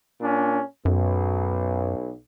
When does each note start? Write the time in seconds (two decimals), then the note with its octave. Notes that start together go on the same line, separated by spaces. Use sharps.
0.21 A#2 C#4 D4
0.85 B1 F#2